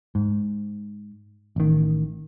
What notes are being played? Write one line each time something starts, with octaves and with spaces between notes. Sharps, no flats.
G#2
A1 D#3